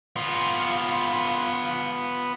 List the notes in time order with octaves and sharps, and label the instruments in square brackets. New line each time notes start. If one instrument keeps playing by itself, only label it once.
[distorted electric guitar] B3 F4